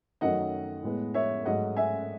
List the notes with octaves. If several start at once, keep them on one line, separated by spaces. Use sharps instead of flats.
F#2 D#3 F#3 A3 D#5 F#5
A2 G#3 B3
C#5 E5
G#2 F#3 A3 D#5 F#5
E5 G#5